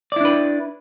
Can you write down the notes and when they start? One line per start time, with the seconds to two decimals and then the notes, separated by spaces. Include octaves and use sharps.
0.12 D5
0.16 E4
0.21 D4
0.25 B4